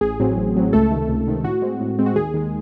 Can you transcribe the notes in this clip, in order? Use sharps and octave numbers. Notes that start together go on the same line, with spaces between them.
A1 G#4
A2 F#3 C4
A1
A2 F#3 C4
C#2 A3 A4
C3 D#3 A3
C#2
C3 D#3 A3
A2 F#4
G#3 C4
A2
G#3 C4
F#4
D#2 G#4
D#3 G#3